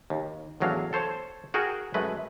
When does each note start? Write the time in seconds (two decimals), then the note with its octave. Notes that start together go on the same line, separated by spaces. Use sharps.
0.10 D#2
0.60 A1 E2 F#3 D4 F5
0.93 A4 C5 C#5 A5
1.54 F#4 G#4 A#4 G5 G#5
1.94 F#2 G#3 A3 B4